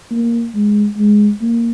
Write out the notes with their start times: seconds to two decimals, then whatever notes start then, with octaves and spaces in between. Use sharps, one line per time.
0.11 A#3
0.55 G#3
0.97 G#3
1.42 A#3